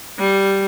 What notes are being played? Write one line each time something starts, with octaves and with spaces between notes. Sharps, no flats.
G3